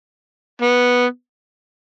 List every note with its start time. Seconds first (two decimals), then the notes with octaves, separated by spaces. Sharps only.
0.62 B3